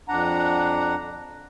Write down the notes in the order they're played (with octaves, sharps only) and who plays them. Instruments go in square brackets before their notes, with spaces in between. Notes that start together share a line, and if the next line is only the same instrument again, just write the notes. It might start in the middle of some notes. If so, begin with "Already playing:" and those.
[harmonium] F2 D4 F#5 A#5